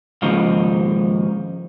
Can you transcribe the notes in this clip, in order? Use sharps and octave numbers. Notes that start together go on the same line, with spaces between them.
D#2 G#2 C#3 F3 D#4